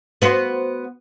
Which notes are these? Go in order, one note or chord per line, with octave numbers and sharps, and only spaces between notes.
B3 F#4 C5